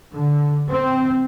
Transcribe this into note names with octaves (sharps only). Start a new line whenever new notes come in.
D3
C4